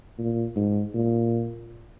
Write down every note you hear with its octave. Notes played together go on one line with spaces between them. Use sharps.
A#2
G#2
A#2